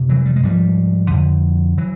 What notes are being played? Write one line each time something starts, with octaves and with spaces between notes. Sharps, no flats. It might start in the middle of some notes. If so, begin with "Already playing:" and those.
Already playing: F2 C3
E3 F#3
G3
G#3
G#2 F3 G3
F2 D3
E3 F#3